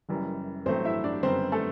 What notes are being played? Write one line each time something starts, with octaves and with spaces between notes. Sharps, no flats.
F#1 F#2 E3 G3
A1 G2 F#3 A3 C4 C5
E4 E5
D4 D5
F#1 F#2 D3 G3 B3 C4 C5
A3 A4